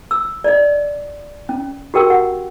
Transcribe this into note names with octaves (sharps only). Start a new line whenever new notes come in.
E6
D5 D#5
C#4
F#4 G4 A#4 G5 E6
F#5